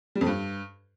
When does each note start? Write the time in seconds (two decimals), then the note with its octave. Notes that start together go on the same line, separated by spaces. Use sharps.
0.15 G3
0.21 F2
0.27 G2